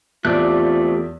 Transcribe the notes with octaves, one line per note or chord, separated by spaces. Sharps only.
E2 A3 C4 F4 G4 D5 F#6